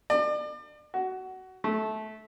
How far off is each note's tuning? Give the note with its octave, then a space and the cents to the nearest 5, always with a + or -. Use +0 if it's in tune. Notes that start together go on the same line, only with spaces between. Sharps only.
D5 +35
F#4 +20
A3 -20